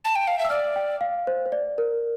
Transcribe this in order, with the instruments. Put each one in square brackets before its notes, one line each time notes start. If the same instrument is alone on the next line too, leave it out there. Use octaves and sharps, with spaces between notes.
[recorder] A5
G5
F5
E5
[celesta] E6
[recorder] D5 [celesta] F6
[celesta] G5
F5
C5
C5
D5
A#4